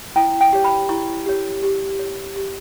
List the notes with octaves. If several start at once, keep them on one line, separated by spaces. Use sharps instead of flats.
E4 G5
G5
G4 C#5
B5
E4 C#6
G4 C#5
G4
C#5
G4